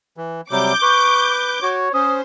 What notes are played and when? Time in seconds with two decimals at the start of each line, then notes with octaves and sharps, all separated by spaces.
0.17 E3
0.51 C3 F#3 G3 D6 G6
0.82 B4 C#6
1.63 F#4 C#5
1.94 C#4 C5 D#6